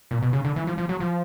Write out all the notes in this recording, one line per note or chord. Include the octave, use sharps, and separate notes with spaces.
A#2
B2
C#3
D3
E3
F3
F3
F#3
F3